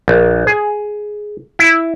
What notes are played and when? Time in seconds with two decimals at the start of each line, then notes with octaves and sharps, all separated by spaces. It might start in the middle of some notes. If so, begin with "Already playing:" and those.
0.08 A#1
0.47 G#4
1.59 E4